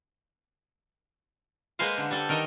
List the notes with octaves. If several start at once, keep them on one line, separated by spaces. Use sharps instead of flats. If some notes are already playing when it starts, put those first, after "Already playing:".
G#3 A#3 B4 C5 F5 F#5
D3
G3 A4
D#3 A#4 D#5